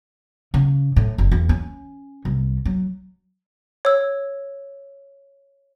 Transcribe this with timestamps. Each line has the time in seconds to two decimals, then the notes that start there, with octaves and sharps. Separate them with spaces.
0.54 C#3
0.96 A2
1.18 F#1
1.31 E2
1.49 C#4
2.25 C2
2.65 F#3
3.85 C#5 E6